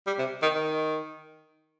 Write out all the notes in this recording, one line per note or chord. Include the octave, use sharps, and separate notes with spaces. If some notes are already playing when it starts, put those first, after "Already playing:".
G3
C3
D#3
D#3